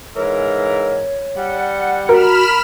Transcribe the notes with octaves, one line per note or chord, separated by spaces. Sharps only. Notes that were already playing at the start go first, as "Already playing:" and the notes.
G#2 E3 A#4 C#5
G3 F#5
F#4 A#4 B5 F6 E7